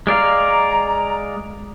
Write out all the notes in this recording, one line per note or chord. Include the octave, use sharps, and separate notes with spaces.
G#3 D5 F5 A#5